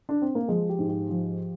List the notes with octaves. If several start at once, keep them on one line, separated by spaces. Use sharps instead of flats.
D4
C4
A#3
F3 G#3
G4
G#2
G4
F3